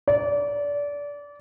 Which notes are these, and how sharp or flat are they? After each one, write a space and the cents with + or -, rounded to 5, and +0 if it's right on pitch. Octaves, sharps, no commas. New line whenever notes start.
D5 -25